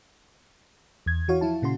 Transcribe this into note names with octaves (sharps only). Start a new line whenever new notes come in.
E2 G#6
E3 F#4 C#5 F5
F3 E4 A5
A#2 C#3 F#4 C6